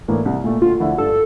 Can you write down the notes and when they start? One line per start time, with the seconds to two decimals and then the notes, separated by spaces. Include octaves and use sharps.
0.08 A2 E3 A#3 D4
0.25 C2
0.44 A#2 A3
0.62 D2 F4
0.80 D3 F3 A3 E4
0.97 G2 A4